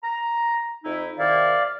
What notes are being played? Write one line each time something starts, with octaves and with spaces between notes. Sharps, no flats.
A#5
F2 D#4 E4
C3 D#3 E4 D5 F5